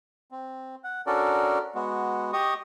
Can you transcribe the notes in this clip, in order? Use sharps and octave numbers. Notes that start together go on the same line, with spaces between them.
C4
F#5
C#4 D4 F#4 A4 A#4 D5
G#3 B3 F#4
G4 D#5 C#6 D#6